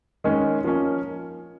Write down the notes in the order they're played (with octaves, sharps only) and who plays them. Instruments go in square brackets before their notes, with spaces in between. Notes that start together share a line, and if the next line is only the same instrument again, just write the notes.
[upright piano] D#3 G#3 C#4
F3 A#3 C#4